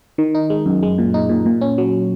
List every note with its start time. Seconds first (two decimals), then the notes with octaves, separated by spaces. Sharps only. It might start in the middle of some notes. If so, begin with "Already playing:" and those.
0.18 D#3
0.35 D#4
0.50 G#3
0.66 F#2
0.83 G#3
0.98 A#2
1.14 D#4
1.29 A#2
1.46 A#2
1.61 C#4
1.78 F#3